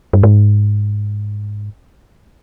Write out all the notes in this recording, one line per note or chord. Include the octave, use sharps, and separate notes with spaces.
G2
G#2